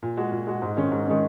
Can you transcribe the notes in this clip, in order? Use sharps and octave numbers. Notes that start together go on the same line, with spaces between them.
A#2
G#3 F#4
A#2
G#3 F#4
G#2
D#3 G#3 C#4
G#2
D#3 G#3 C#4